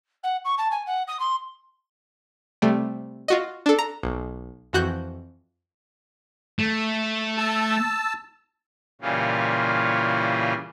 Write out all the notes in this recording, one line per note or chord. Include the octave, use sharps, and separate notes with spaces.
F#5
C#6
A5
G#5
F#5
D#6
C6
C3 G3 A3
F4 F#4 D#5
D4 A4
A#5
B1
F2 E3 F#4 F#6 G6
A3
A5 E6
A#2 C#3 E3 G3 C#4 F4